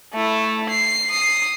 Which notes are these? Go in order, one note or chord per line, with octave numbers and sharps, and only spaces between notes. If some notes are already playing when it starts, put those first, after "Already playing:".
A3 E4
C7
D#6 C7